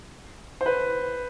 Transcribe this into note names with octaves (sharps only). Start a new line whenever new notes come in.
C5
B4